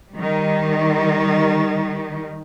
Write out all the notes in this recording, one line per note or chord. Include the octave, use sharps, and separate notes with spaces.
D#3 G3